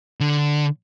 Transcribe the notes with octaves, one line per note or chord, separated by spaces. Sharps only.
D3